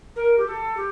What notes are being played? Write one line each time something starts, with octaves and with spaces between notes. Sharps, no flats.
A#4
G4
A4
G4